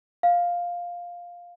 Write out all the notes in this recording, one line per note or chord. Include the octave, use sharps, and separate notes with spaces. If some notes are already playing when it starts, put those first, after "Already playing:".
F5